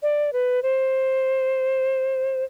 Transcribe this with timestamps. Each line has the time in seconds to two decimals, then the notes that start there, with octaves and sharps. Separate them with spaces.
0.02 D5
0.33 B4
0.63 C5